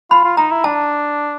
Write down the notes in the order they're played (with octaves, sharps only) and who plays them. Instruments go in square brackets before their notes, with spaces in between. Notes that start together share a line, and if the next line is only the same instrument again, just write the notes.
[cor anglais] F4 [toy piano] B5
[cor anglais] F4
[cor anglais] D#4 [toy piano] A#5
[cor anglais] E4
[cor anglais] D4 [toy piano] A5